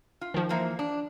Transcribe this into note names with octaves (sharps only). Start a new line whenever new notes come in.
F4
D#3 F3
E3 A#3 C5
D4